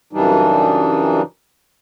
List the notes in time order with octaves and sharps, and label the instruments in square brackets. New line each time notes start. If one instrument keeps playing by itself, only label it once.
[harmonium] F#2 C#3 E3 G3 D4 D#4